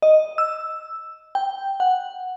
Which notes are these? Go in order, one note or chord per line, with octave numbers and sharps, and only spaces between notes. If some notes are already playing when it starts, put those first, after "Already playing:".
D#5
E6
G5
F#5